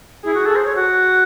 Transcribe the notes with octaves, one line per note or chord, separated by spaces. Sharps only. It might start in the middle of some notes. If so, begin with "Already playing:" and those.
E4 G#4
F#4
A4
C5
C#5
F#4